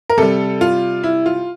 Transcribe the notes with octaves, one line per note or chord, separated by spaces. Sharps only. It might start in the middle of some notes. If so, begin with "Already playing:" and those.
A#4
C3 G3 A4
F4
E4
F4